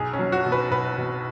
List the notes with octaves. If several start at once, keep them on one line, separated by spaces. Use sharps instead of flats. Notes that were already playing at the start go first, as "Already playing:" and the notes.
Already playing: B1 G#4
C#4
F#3
F#4
B2
B4
B1 B4
B2